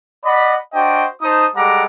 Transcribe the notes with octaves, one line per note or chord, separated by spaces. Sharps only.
D5 D#5 F#5 B5
D4 F#4 C5 D#5 G5
D#4 C5 A5 D#6
G3 G#3 A4 F#5 A#5 D6